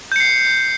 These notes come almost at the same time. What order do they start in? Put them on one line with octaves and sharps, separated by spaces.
G6 C#7 C7